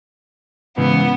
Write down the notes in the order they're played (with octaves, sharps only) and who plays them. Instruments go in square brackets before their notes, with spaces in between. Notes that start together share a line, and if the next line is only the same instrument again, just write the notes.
[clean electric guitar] G#2 C#3 E3 [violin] B3